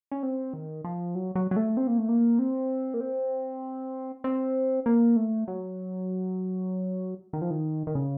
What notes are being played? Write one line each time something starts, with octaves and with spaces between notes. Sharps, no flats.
C#4
C4
D#3
F3
F#3
F#3
F#3
A3
C4
A#3
A3
A#3
C4
A#3
C4
C4
A#3
A3
F#3
D#3
F3
D#3
D#3
C#3